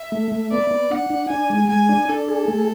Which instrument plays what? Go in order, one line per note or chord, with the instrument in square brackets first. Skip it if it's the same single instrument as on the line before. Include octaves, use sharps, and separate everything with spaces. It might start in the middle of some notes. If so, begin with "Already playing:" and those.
Already playing: [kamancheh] E5
[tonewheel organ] A3
A3
[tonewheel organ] B3 [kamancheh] D5
[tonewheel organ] B3
[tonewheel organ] D4 [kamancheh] F#5
[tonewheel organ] D4
[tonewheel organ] D4 [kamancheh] G#5
[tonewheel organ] G#3
[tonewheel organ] G#3 [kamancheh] G#5
[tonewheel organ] D4
[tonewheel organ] D4 [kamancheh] A4
[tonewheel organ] G#4
A3